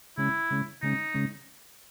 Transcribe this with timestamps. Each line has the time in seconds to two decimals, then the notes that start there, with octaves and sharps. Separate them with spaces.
0.18 C#3 G#3 C#4 E4
0.50 C#3 G#3 C#4
0.82 C#3 G#3 C#4 D#4
1.14 C#3 G#3 C#4